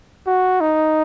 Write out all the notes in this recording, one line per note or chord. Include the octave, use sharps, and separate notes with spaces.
F#4
D#4